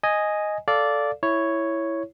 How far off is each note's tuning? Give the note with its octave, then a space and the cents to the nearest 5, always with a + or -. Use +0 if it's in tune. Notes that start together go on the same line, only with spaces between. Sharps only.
D#5 +0 G#5 +0
A4 +0 D5 -10 F5 +0
E4 +0 C#5 +0